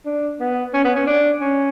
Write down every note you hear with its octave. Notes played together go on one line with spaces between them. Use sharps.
D4
B3
C#4
B3
C#4
D4
C#4